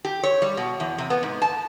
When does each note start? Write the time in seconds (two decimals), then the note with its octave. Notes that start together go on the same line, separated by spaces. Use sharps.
0.05 G4
0.23 C#5
0.42 G3
0.57 B2
0.80 E2
0.98 C3
1.10 B3
1.23 G#2
1.42 A5